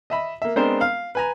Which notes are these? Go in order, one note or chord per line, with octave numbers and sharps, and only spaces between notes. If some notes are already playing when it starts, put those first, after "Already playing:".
D#5 E5 B5
A#3 E5
G#3 B3 C4 D4 A#4 C5
F5
B4 G#5 A#5